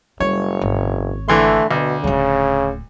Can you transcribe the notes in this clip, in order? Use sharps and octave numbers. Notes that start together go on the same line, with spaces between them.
F#1 G3 C#5
G#1
D3 E3 A3 C6
D2 B2
D1 C#3 A3